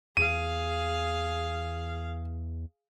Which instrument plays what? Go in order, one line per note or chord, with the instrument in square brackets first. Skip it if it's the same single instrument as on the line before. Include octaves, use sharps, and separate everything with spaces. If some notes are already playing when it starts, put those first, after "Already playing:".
[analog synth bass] E2 [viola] G#4 F5 [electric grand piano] D#7